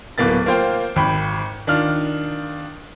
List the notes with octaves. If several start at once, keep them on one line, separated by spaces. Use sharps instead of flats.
D1 A#3 B3 A6
A#3 F4 C5 F5 G5
G#1 G5 B5
D#3 D4 F4 F6